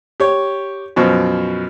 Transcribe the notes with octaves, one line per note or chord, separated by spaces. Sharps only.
G4 C#5
F#2 B2 F3